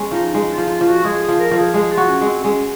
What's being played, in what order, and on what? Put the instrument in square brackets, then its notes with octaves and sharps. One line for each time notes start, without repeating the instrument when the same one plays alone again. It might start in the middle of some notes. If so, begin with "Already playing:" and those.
Already playing: [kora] G#3 C#4
[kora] F3 [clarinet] D#4
[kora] G#3 [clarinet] D#4
[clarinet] F4
[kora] F3
[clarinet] D#4
F4
[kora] F3 [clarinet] F4
[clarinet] F#4
[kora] G#3 [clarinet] G#4
[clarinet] G#4
[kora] F3
[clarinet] A#4
[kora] F3
[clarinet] G#4
[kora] G#3 [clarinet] G#4
[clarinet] F4
[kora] F#4
[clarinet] C#4
[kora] G#3
[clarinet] C4
[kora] G#3 [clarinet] C#4